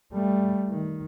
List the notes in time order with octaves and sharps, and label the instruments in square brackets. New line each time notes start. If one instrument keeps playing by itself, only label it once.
[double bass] G3 A3
D#3